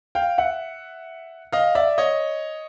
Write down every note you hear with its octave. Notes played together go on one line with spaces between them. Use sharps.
F5 G5
E5 F#5
D#5 F5
D5 E5
C#5 D#5